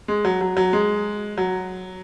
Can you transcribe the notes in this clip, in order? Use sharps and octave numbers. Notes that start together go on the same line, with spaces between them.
G#3
F#3
F#3
F#3
G#3
F#3